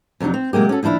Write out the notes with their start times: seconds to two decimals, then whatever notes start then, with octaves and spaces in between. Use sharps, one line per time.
0.20 F2 C3 F#3 D4 D#4
0.34 C4
0.53 C3 F#3 G#3 A#3 G4
0.69 C#4 F#4 A4
0.83 D#2 F3 D4 E4 F5